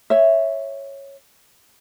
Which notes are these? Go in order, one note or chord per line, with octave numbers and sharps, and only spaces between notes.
C#5 E5